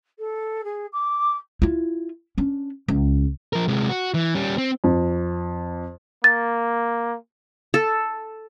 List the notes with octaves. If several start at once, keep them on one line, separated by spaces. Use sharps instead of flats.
A4
G#4
D6
E4 F4
C#4 D4
C#2
F3 A#4
C3 G#3
F#4
E3
G3 C#4
C4
F2
A#3 A6
A4